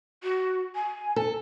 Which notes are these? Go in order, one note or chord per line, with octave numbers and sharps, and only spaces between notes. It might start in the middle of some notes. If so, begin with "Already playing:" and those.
F#4
G#5
A4